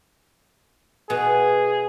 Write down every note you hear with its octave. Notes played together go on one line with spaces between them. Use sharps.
B2 G#4